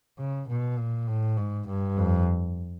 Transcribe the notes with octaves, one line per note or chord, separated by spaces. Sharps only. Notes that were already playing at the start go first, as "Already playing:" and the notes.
C#3
B2
A#2
A2
G#2
G2
F2